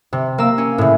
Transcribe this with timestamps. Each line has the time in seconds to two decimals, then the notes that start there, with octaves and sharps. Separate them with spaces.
0.13 C3
0.38 A#3 E6
0.58 C#4
0.78 A2 C#3